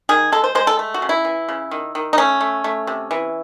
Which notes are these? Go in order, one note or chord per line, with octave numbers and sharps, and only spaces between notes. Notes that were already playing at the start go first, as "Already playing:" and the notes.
D#3 G#4
G#3 A4
C5
G#3 C5
A4
A3
F#4
C#3
E4
E3
C#3
D#3
D#3
D#4
A3 C#4
A3
A3
C3
E3